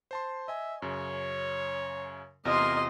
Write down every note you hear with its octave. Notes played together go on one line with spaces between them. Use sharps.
C5 A5 C6
D#5 E5 G#5
F#2 C#3 C#5
E2 C3 F4 A#4 D#5 C6